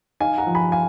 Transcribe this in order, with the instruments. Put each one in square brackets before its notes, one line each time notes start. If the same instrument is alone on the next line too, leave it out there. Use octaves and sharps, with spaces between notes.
[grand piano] D#4 F5 G#5
F#5 A#5
F3
G#5 B5
F5 G#5